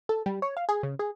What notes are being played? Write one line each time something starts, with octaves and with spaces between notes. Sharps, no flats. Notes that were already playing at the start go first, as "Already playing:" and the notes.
A4
G3
C#5
F5
G#4
C#3
G#4